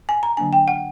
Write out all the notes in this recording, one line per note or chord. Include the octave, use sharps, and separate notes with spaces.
G#5
A#5
D3 F#3 A#3 D4 G#5
G5
F#5